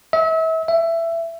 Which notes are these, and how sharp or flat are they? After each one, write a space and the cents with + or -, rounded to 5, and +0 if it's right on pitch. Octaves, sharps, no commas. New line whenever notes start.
E5 -35
E5 +15